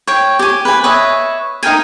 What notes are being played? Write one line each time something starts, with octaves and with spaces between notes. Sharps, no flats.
C#5 G5
G4 G#5
B4 G#5
B4 C#5 D#5 E5
D#4 A#4 G5 G#5